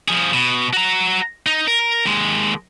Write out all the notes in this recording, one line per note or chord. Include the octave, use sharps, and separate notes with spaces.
F3 G#4
B2
F#4 A#5
D#4
A#4
D#2 G#3